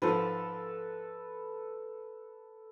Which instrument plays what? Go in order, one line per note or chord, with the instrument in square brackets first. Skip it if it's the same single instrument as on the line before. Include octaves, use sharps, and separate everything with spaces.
[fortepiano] G#2 F3 [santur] A4 B4